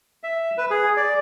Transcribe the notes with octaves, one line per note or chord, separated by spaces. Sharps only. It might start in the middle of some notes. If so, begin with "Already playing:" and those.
E5
B4
G#4
D5